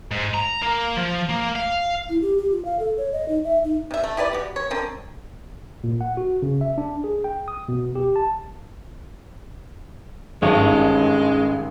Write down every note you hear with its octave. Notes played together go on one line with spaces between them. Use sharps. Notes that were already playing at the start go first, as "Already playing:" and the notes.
G#2
A#5
A#3
F3
A#3
F5
E4
G4
G4
F4
F5
A4
C#5
D#5
D#4
E5
D#4
C3 E5
A3
E4 G4 B4 D5
F#4 G4
C#5
D3 C4 A#4
A#2
F#5
F#4
C#3
E5
D4
G#4
G5
D#6
B2
G4
A5
G#1 G2 G#3 C#4 A4 C#5